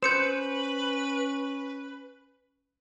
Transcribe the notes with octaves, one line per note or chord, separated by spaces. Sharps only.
C#4 B4 C5 G6 C#7 E7